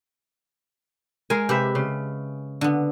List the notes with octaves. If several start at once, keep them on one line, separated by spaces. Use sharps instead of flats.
G#3 A#4 G#5
C3 G4 B4 E5
C#3
D3 B3